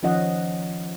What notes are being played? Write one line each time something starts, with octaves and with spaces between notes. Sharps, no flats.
D#3 F3 C#4 D#5 F#5